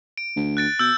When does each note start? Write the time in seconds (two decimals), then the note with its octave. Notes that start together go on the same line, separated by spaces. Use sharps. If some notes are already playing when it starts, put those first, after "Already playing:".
0.18 D7
0.36 D2
0.57 F#6 A6 D7
0.79 B2 E6 G6